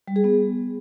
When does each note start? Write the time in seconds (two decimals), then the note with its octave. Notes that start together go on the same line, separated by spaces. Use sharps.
0.08 G3
0.16 G#4
0.24 B3